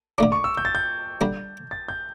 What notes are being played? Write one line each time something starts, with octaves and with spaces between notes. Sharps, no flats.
D3 A3 D4 D6
C#6
E6
G6
A6
G6
D3 G3 D4
A6
G6